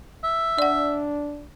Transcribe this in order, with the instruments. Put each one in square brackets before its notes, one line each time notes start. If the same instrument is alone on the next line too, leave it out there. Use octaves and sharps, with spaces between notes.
[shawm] E5
[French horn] D4 [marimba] D5 F#5